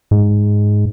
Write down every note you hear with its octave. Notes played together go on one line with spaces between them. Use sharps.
G#2